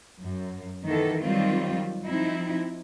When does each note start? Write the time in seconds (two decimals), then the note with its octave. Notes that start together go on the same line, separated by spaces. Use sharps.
0.21 F#2
0.85 D#3 E3 B3 A4
1.22 D#3 F#3 G3 C4 F4
2.04 F3 C4 D#4 E4